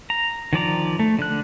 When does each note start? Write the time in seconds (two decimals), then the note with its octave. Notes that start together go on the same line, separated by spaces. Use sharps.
0.10 A#5
0.53 D#3 F3 D5 A#5
0.99 A3
1.19 D3 F#6